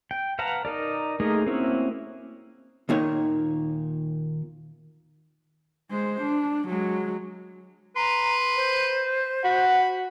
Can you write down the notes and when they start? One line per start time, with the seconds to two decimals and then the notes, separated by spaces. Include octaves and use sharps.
0.11 G5
0.39 B4 F5 F#5 A5 A#5
0.65 D#4 A#4 D5
1.20 A3 A#3 D#4 G#4 A#4
1.46 A#3 C4 C#4 E4 F#4
2.89 D#2 A#2 D#3 C#5
5.91 G#3 C5
6.21 D4
6.68 F#3 G#3
7.96 B4 A#5 C6
8.56 C5
9.44 F#4 F#5 B5